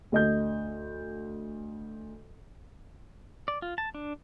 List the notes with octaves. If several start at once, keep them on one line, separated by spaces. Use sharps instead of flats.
D2 D#5 G6
D5
F4
A5
D4